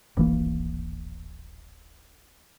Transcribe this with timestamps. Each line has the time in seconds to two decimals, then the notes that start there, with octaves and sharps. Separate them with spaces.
0.17 D1 G#1 E3 A#3